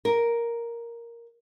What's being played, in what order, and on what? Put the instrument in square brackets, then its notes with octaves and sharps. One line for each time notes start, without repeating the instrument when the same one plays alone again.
[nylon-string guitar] A#4